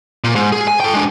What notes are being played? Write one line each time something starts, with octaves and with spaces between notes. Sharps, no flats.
A#2
G#2
G#4
G#5
A4 G5
G#3 D4